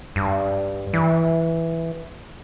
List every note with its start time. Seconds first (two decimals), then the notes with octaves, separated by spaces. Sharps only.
0.16 G2
0.93 E3